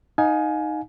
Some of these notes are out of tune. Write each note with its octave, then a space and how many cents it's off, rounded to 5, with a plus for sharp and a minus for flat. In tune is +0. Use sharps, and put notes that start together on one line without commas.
D#4 +0 F5 +30 G#5 +20